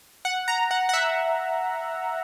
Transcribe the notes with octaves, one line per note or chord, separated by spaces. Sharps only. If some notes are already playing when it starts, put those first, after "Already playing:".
F#5
A#5
F#5
F#5
E5